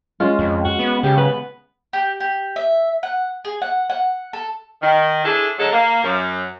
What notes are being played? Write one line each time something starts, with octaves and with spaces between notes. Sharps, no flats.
G#3 C#4 F4
F2
F#4
B3
C#3 G4
B3 B4
G4
G4
E5
F#5
G#4
F#5
F#5
A4
D#3
D4 E4 G#4 A4 C5
D3 F#3 G#3 A4 A#4
A#3
F#2